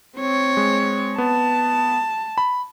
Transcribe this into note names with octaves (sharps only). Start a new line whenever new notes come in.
C4 C#5
G#3
B3 A5
B5